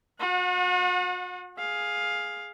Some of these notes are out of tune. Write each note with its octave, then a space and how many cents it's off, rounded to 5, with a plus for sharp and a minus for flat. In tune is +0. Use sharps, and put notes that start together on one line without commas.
F#4 -45 F#5 -25
G#4 +0 F5 +10